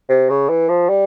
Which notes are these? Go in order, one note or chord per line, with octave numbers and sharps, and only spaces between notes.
C3
C#3
E3
F3
G3